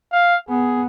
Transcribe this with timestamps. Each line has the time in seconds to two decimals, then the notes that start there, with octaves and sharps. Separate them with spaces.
0.12 F5
0.49 B3 G#4